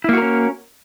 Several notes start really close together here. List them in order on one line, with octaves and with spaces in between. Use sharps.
E4 A#3 F#4 A#4 C#4